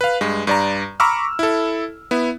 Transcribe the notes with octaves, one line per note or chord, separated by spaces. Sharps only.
B4 F5
G2 G#3
G2 D5 A#5
A#5 B5 C#6 D6 E6 F6
E4 A4
B3 E4